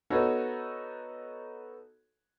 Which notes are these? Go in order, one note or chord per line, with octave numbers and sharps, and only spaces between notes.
B3 D#4 F#4 A4 C#5